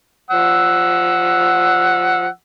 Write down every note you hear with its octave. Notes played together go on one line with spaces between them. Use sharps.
F3 F#5 E6